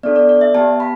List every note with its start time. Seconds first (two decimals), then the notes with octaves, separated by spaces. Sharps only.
0.03 B3 D4 A4 D5
0.16 D5
0.29 D5
0.41 E5
0.54 B3 G4 A5
0.80 B5